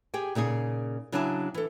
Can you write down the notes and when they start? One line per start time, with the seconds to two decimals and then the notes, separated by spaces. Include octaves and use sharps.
0.14 G4 G#4 G5 G#5
0.35 A#2 C#3 D#4 G#4
1.12 C#3 F#3 D4 E4 G#5 A5
1.54 E3 A4